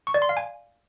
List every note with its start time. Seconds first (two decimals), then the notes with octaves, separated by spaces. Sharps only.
0.07 C#6
0.14 D5
0.22 C6
0.29 F5
0.37 G#5